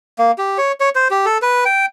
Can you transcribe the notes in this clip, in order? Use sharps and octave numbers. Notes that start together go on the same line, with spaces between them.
A#3
G4
C#5
C#5
C5
G4
A4
B4
G5